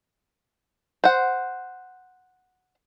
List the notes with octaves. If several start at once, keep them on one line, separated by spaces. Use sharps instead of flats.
C5 F#5